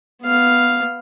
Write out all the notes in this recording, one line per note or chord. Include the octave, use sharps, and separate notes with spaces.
B3 F5